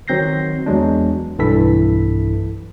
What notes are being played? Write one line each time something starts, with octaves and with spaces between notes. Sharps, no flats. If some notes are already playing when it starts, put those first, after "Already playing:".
D#3 F#3 C4 G6 A#6 C7
E2 F#3 G#3 D4
B1 G2 E3 E4 A4 B6